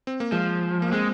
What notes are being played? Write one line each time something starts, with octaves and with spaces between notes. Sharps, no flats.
C4
A#3
F3 G#3
A#3
G#3 C4